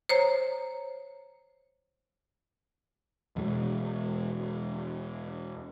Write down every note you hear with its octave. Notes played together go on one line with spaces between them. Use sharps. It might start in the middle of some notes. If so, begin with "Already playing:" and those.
C5 C#5 A#5
E2 B2 G#3